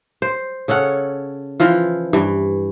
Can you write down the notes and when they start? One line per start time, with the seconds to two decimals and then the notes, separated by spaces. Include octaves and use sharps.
0.22 C5
0.68 C#3 C#4 A4 F#5
1.60 E3 F3 F4
2.13 G2 E3